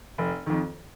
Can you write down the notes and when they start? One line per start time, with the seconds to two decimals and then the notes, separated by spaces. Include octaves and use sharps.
0.18 F1
0.46 F2 D#3